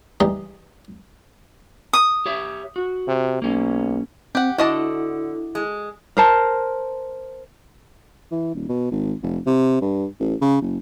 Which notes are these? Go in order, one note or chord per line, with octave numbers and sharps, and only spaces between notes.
E3 G3 D#4 A#5 C6
D#6
G4 C#5 E5
F#4
C3
B1 A#3 C#4
C4 G4 F#5
D3 E4 F#4 D#5 A5
G#3
A#4 C5 A5
E3
D#1
B2
G#1
F1
C3
G2
A1
C#3
F#1